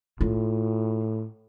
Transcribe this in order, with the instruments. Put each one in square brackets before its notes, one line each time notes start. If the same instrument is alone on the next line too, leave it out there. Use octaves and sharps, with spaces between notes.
[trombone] A2 [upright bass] F4